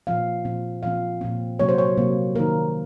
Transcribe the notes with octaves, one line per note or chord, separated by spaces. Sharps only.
A#2 F3 C4 F5
A#2 F3 C4
A#2 F3 C4 F5
A#2 F3 C4
C3 F#3 A#3 C#5
C5
C#5
C3 F#3 A#3
D#3 A#3 A#4